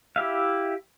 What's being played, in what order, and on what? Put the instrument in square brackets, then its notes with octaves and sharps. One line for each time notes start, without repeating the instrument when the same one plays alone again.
[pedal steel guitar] E4 G4 E5 F5